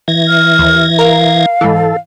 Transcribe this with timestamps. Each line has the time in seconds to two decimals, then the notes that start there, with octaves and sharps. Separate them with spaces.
0.08 E3 G#6 A#6
0.28 F6
0.59 D#2
0.99 A#4 F5
1.61 G#2 E3 A4